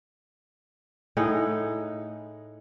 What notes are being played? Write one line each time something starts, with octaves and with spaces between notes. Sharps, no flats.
A2 D#4 G#4 F#5